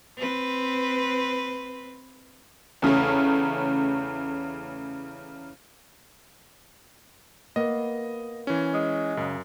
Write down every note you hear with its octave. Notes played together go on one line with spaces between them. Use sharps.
C4 B4
E2 C#3 A3 C#4
A#3 B3 D#5
E3 C#4
G#3
F#2 C#3